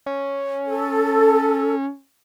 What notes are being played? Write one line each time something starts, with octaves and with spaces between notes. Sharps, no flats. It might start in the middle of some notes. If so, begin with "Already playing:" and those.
C#4
A4